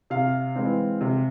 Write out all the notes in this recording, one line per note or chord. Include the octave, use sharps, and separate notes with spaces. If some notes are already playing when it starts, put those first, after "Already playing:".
C3 F5
E3 G#3 C4
C3